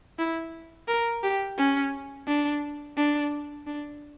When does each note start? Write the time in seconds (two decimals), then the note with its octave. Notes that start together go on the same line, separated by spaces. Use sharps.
0.19 E4
0.88 A#4
1.23 G4
1.58 C#4
2.27 D4
2.97 D4
3.67 D4